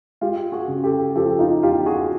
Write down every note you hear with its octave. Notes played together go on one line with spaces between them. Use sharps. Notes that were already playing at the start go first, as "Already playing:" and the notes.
G#3 F4 G4
F#4 G#4
C#3
G4 A4
F3 G4 A4
D#4 F4
E2 F4 G4
F#4 G#4